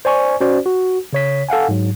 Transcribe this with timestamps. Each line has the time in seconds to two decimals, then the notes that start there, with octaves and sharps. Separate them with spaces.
0.05 C5 D5 G#5 C#6
0.41 C#4 F#4 C5 D5
0.66 F#4
1.13 C#3 C#5 B6
1.49 A4 F5 F#5 G#5
1.69 G#2 F#3